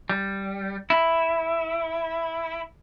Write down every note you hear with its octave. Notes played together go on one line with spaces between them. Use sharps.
G3
E4